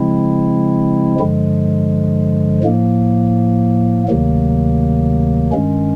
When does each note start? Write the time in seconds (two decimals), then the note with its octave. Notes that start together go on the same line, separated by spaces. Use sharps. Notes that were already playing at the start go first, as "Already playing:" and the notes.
Already playing: C#3 F3 G#3 C4 E4
1.19 G2 D3 F3 G#3
2.64 A2 F3 A#3
4.08 D2 C3 D#3 F#3 A#3
5.52 G2 D#3 G#3 C#4